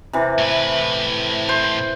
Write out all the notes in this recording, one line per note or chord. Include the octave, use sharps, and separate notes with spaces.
C3 E3
A2 B4
C5